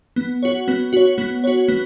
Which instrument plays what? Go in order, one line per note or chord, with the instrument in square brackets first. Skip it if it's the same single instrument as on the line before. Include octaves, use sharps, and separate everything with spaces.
[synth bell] B3
F#4 C#5
B3
F#4 C#5
B3
F#4 C#5
B3